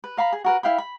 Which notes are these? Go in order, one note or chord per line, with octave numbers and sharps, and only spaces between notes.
B4
A#4 F5 A#5 B5
G#4
F#4 A#4 B4
E4 F5 G5 B5
B5